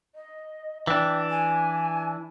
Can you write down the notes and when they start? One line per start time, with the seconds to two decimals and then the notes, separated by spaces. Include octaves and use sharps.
0.15 D#5
0.87 E3 D4 G5
1.30 G#5